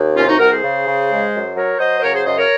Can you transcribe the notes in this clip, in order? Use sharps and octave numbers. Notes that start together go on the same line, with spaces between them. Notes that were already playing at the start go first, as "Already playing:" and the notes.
Already playing: D#2
C2 C#4 F4
D#4 F#4
C2 F#4 A#4
G#4 C5
C#3
C#3
G#3
F#2
F#3 A#4 C#5
F#3 C5 D#5
C5
C#3 A#4 C#5
G#4 C5
F#2 C5 D#5
A#4 C#5